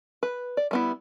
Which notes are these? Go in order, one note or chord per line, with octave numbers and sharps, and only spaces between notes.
B4
D5
G3 B3 E4